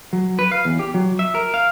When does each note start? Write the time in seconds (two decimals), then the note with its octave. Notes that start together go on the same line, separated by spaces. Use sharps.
0.13 F#3
0.39 B4
0.52 F5
0.65 E2
0.79 G4
0.94 F#3
1.19 E5
1.35 A#4
1.54 F5